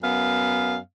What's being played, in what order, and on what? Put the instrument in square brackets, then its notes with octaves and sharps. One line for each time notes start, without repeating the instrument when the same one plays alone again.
[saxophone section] F#2 B3 F5